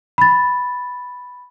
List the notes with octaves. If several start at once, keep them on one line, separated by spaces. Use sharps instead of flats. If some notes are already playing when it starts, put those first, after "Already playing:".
B5 A6